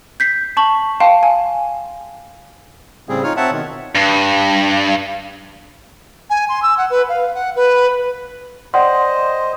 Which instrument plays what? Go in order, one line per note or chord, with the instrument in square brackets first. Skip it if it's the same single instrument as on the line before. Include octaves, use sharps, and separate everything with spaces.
[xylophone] G6 B6 C7
A5 C#6 F#7
F5 G5 A5 C6
G#5
[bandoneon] A2 C#3 G3 C4 G#4
D#4 F4 C#5 F6
C4 C#5 E5 F#5 A5
B2 D#3
[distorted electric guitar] G2
[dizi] G#5
C6
E6
F#5
B4
F5
F#5
B4
[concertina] C5 D#5 [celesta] D5 F#5 [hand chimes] G5 C6